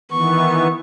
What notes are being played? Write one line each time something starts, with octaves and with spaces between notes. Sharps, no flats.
D#3 E3 B3 C#6